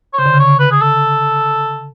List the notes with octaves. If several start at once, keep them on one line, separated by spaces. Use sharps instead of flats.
C#5
C#3 C5
D3
C#3
C#5
B4
G#4
A4